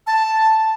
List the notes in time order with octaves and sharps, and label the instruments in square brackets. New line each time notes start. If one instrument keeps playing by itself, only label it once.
[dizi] A5